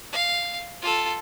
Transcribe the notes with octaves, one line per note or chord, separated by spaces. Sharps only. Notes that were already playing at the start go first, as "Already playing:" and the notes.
F5
F4 A4